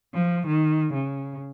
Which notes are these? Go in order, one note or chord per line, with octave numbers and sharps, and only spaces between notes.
F3
D#3
C#3